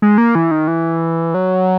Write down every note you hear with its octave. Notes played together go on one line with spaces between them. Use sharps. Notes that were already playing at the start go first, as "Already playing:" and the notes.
G#3
A#3
E3
D#3
E3
F#3